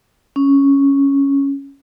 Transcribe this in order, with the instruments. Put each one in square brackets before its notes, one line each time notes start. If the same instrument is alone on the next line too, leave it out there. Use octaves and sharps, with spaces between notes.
[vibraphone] C#4